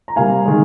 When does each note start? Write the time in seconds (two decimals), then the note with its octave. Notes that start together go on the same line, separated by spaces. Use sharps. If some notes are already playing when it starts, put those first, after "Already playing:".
0.08 A#5
0.16 C3 G3 A#3 F5 G#5
0.45 D#3 G#3